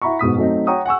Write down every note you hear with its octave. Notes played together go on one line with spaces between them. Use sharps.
E4 E5 F#5 A#5 B5 C#6
G#2 B2 D#6 B6
F#3 A3 C4 D#4
C#5 F#5 G5 A#5 C#6 D#6
F#5 G#5 C#6 E6